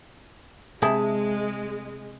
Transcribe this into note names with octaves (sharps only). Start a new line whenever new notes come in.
C3 G#3 E4 G#4 A5